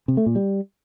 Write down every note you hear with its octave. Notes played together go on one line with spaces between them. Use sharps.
C3
A3
A#2
G3